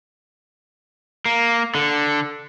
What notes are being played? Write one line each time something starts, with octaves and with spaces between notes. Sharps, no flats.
A#3
D3